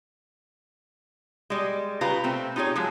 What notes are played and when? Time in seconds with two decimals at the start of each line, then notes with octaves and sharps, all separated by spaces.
1.50 G3 G#3
2.01 C#3 F4 G4 B4 A#5
2.24 C3 A3 C4
2.56 D#4 F4 G4 G#4 C#5
2.76 F3 F#3 G#3